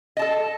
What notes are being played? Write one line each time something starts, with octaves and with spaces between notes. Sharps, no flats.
A4 D#5 A5